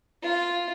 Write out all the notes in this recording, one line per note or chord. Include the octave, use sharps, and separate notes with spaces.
F4